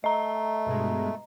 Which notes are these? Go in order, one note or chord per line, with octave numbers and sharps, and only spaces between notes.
A3 D#5 A#5
G2 B2 G#3